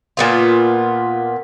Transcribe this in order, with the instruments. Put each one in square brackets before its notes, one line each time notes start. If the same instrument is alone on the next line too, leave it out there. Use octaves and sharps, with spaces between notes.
[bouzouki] A#2 B3 F4